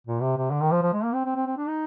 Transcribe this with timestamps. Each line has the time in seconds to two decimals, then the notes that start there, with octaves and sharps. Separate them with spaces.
0.07 A#2
0.21 C3
0.36 C3
0.51 D3
0.61 D#3
0.71 F3
0.82 F3
0.93 G#3
1.03 A#3
1.14 C4
1.25 C4
1.36 C4
1.46 C4
1.57 D4
1.68 D#4